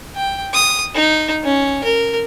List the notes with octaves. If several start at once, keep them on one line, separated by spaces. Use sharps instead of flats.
G5
D#6
D#4
C#4
A#4